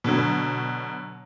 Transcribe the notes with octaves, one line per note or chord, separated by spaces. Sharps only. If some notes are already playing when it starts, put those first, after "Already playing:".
B2 D3 F#3